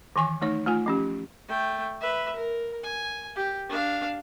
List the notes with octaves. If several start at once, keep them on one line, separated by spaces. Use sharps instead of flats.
D#3 E3 G#5 C#6
A3 D#4 C#5
A3 F4 G#5
F3 C#4 G4
A3 G5
B4 E5
A#4
G#5
G4
D4 F5